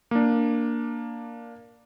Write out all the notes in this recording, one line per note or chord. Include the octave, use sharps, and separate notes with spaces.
A#3 D4